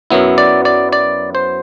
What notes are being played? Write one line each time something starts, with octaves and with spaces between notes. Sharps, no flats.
F#2 F#3 B3 E4
D5
D5
D5
C5